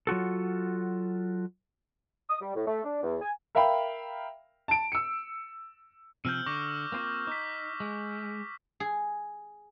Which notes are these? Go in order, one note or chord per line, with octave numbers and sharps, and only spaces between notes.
F#3 F4 F#4 A4
D#6
G3
A2
A3
D4
E2
G#5
A#4 E5 F5 G5 B5
A5 D7
E6 C#7
C3 F3 C4 E6 F6 G6
D3 C#6 D6 A#6
A#3 C4 F4
D#4 D6 B6
G#3
G#4